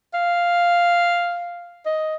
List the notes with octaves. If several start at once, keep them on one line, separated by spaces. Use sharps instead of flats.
F5
D#5